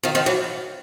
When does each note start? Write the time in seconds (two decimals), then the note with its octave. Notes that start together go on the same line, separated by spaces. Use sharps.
0.03 D#3 F3
0.15 D#3 F3
0.26 E3 F#3